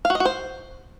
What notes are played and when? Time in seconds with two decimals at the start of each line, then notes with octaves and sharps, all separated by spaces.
0.05 F5
0.10 F#4
0.15 D#5
0.20 F#4
0.25 C5